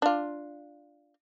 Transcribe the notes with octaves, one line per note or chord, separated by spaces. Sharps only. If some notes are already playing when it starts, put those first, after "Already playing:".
D4 F4